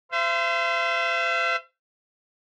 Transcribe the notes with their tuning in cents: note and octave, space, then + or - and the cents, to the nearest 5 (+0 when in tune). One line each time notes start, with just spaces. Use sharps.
C5 -25 E5 +45